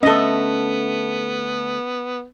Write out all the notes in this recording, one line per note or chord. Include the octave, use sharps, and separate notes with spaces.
D3 A3 B3 C#4 A4 D#5 E5